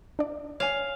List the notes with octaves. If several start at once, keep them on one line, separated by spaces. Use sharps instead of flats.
D4 D5
C#5 F5 G#5